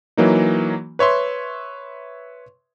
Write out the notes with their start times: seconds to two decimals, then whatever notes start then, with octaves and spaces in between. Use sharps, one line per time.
0.17 E3 F#3 A#3 D#4
0.99 B4 C#5 E5 C6